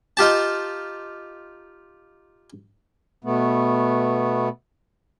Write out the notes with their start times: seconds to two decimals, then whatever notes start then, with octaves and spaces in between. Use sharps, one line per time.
0.17 D#4 F4 G4 A5
3.24 B2 A3 B3